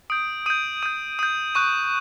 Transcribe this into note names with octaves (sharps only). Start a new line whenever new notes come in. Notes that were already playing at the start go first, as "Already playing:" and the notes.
D#6 G6 D7
D#6 G6 D#7
D#6 G6 D#7
D#6 G6 D#7
C#6 F#6 D#7